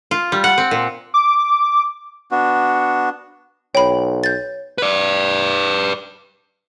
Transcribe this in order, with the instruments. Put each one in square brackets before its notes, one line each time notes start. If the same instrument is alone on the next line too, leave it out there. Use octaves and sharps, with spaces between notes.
[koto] F4
G3
F#5
C4
A#2
[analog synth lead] D6
[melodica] B3 D4 F#4
[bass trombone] B1 [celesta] C#5 [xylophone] G5 B5
[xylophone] G6 A6
[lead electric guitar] B4 D5